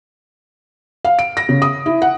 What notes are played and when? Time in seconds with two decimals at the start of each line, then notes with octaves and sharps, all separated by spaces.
1.05 F5
1.19 D7
1.37 A#6
1.49 C#3
1.62 D#6
1.86 E4
2.02 F#5